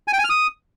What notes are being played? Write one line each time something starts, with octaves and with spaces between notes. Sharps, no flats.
G#5
G5
G#5
F6
D#6